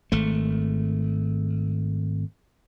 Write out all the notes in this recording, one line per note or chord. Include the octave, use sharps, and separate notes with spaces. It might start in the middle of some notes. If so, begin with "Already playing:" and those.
G#1 A3